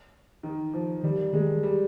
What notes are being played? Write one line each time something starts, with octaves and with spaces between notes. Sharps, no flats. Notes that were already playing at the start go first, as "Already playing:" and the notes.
D#3
F3
D#3 G3
D#3 G#3
G3